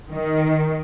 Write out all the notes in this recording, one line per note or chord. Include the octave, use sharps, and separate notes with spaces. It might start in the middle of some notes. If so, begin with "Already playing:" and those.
D#3